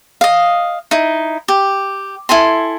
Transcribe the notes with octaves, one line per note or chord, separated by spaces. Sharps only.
D#5 F5
D#4 E4
G4
E4 A4 G#5 C6